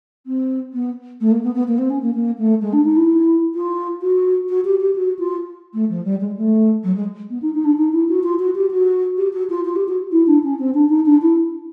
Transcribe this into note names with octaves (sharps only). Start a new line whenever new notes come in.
C4
B3
A3
A#3
B3
B3
A#3
C4
C#4
A#3
A#3
A3
G#3
D4
D#4
E4
F4
F#4
F#4
G4
G4
F#4
F4
A3
F3
G3
G#3
A3
F#3
G#3
B3
D#4
D#4
D4
D#4
E4
F#4
F4
F#4
G4
F#4
G4
F#4
F4
F4
G4
F#4
E4
D4
C#4
C4
D4
D#4
D4
E4